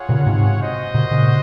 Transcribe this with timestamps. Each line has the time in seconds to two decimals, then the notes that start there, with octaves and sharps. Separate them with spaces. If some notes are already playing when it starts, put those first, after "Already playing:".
Already playing: F4 G#4 C#5 F#5
0.09 A#2 C#3
0.20 C#3
0.26 G#2 C3
0.61 F#4 C5 D#5
0.94 A#2 C#3
1.11 A#2 C#3